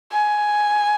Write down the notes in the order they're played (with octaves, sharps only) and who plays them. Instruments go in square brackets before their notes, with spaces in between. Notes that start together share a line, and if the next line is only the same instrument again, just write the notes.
[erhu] G#5